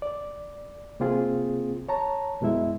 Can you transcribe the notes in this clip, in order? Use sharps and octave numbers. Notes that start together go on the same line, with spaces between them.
D5
C3 A#3 C4 F4 G#4
C#5 A5 A#5
F#2 B2 G#3 E4 E5